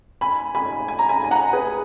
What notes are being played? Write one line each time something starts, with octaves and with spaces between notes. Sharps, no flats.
G#5 B5
G#5 B5
G#5
A#5
G#5 B5
G#5
F#5 A#5
G#4 B4